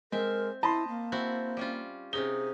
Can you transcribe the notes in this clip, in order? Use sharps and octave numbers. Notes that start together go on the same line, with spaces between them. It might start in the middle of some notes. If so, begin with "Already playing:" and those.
G#3 C4 A#4 E5
E4 D#5 A5 B5 C6
A#3
C4 E4 F#4
G3 C#4 F4
C3 C#4 D#4 G#4 G7